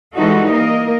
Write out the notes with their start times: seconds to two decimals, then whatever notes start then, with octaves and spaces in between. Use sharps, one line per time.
0.15 E3 G3 G#3 D#4 F#4 A4
0.50 A#3 A#4 D#5